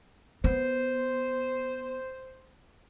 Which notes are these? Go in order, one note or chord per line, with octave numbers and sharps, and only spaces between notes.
B3 C5